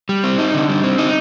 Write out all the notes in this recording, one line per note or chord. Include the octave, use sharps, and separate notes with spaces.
G3
C4
D#4
D3
G3
C4
D#4